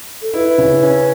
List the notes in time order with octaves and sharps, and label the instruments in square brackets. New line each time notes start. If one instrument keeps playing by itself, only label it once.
[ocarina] A4
[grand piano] E4 [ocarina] B4
[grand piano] C#3
C#4